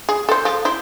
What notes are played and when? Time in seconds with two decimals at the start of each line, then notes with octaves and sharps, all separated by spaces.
0.09 G#4
0.29 A4 C5
0.45 F3
0.65 E4 C5